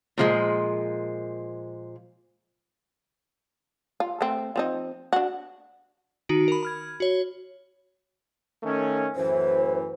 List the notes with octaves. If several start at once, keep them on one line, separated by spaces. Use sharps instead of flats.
A#2 F3 G#3
F4
A3 C4
F3 C4 D#4
D4 F#4
D#3 D#4 F#4 D7
A#4 B5
B5 F6 G#6
F#4 C#5
D#3 A3 C#4
F#2 A2 E3 C5